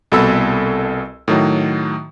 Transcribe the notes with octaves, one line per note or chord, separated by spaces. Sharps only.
C2 B2 A4 B5 E6
A2 D#3 F#3